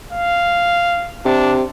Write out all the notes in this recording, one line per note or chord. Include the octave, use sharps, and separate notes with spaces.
F5
C3 D4